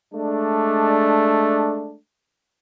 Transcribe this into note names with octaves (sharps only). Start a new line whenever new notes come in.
G#3 A3 D4